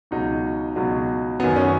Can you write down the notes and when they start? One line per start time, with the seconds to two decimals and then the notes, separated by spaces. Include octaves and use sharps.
0.11 C#2 B2 F#3 D#4
0.76 C#2 B2 F#3
1.40 F#2 D#3 F#3 B3
1.56 C#4